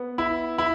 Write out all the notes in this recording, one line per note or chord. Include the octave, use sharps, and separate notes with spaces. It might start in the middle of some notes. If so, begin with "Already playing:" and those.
Already playing: B3
E4
E4